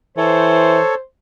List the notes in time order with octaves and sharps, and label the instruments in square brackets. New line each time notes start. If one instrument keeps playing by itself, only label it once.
[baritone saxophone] E3 [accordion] A4 C#5 [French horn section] C5